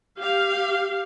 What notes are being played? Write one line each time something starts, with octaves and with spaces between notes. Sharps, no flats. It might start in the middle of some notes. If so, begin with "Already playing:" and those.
G4 F5